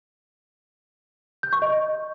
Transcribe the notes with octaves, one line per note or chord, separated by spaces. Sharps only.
G6
C#6
D#5